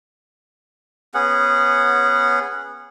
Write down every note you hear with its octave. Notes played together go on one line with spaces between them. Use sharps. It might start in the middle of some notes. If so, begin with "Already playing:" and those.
B3 C#4 G#4 F#5